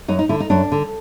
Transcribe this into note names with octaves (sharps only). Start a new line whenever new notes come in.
F#2 D#4
D#4
D3 E4
D#4
F#2 D4
D3